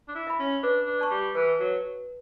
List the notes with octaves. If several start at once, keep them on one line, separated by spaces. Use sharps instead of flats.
D4
E4
E5 B5
C#4
D4 B4
D4
D5 A5 C#6
G3
E3 B4
F#3